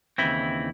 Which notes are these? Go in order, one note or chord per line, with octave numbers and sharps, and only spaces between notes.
D#2 C#3 E3 C4 E4